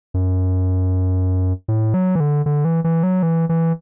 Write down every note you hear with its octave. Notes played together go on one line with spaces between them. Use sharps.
F#2
A2
F#3
E3
D3
D3
E3
E3
F#3
E3
E3